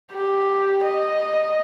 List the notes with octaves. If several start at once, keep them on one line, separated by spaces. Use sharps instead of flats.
G4
D#5